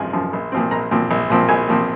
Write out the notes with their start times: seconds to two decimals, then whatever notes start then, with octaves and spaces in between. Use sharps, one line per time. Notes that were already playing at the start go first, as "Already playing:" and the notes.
Already playing: G#1 F#2 F3 G#5
0.13 F#2 F3
0.33 A#1
0.52 A#2 F3 C4
0.71 A#1 A#5
0.91 A#2 F3 C4
1.11 A#1
1.30 A#2 F3 C4
1.49 A#1 G#5
1.69 A#2 F3 C4